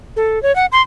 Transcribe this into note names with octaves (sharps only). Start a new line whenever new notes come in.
A4
C#5
F#5
C6